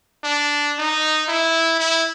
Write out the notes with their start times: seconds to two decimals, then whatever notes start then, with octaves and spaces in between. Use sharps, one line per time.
0.24 D4
0.78 D#4
1.29 E4
1.80 E4